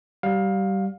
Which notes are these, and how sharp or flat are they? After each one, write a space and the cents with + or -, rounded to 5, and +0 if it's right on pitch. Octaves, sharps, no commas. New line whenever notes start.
G3 -20 F5 +20